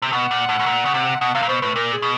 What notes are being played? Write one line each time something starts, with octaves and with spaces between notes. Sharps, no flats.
C3
B2 F#5
A#2
A2
A2
A#2
C#3
C3
B2 F#5
C3 F5
A#2
B2 C5
A2 B4
A#2 A#4
G#4
B2